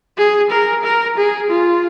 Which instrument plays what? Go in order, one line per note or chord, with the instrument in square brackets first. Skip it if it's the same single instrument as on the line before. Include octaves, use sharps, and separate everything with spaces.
[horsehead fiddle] G#4
A#4
A#4
G#4
F4